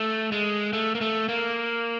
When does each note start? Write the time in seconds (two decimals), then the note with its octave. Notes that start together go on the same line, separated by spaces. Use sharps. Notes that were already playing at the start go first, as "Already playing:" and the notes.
Already playing: A3
0.32 G#3
0.73 A3
0.95 A#3
1.01 A3
1.29 A#3